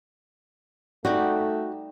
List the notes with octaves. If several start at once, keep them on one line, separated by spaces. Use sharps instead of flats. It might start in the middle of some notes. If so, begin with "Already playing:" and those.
G3 A3 D#4 F#4 G4